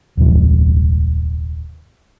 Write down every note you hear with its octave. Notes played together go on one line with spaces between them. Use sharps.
D#1 C2 G#2 F3